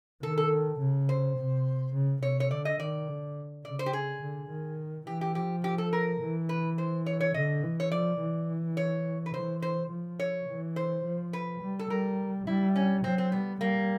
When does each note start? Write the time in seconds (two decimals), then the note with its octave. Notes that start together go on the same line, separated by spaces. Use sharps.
0.23 D#3 A4
0.38 A4
0.80 C#3
1.09 C5
1.38 C3
1.93 C#3
2.23 C3 C#5
2.40 C#5
2.51 D3 D5
2.65 D#5
2.80 D#3 D5
3.08 D3
3.65 C#3 D5
3.79 C5
3.86 G4
3.93 G#4
4.22 D3
4.50 D#3
5.07 E3 G4
5.21 G4
5.35 F3 G4
5.64 G4
5.78 A4
5.93 A#4
6.21 E3
6.49 B4
6.78 C5
7.06 C#5
7.20 C#5
7.34 D3 D#5
7.63 E3
7.80 C#5
7.92 F3 D5
8.21 E3
8.77 C#5
9.26 B4
9.34 E3 C5
9.62 C5
9.90 F3
10.20 C#5
10.48 E3
10.76 C5
11.04 F3
11.33 B4
11.62 G3
11.79 A4
11.90 G3 A#4
12.47 G3 E4
12.76 C#4
13.04 F#3 C4
13.18 C4
13.32 G3 B3
13.61 G3 A#3